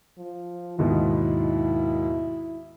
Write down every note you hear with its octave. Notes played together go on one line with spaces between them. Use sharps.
F3
D#2 G#2 B2 E4